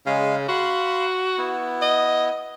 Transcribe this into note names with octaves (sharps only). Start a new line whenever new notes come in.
C#3 G#3 F5 G#5
F#4 F5 B5 C6
B3 E4
D#5